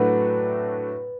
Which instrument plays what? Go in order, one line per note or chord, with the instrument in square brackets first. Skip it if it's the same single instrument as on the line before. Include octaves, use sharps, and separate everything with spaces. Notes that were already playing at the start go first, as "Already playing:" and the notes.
Already playing: [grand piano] A2 F#3 A3 D4 F#4 [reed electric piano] B4